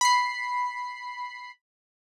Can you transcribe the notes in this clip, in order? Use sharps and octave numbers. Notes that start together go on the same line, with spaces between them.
B5 C7